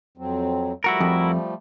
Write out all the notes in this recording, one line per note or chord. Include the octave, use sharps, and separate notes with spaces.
F2 F#3 C4
F3 G3 A3 E4 F#4 A#4
F2